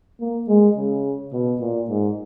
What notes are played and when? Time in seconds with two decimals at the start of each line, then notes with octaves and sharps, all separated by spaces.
0.21 A#3
0.48 G#3
0.76 C#3
1.33 B2
1.60 A#2
1.89 G#2